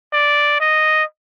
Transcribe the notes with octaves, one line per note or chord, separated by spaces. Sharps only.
D5
D#5